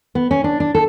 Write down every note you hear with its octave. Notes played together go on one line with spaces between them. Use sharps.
B3
C#4
D4
D4
A4